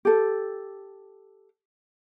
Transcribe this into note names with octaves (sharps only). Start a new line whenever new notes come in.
G4 A4